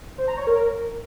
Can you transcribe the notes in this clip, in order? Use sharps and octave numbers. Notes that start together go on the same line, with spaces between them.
C5
A#5
C#5
A#4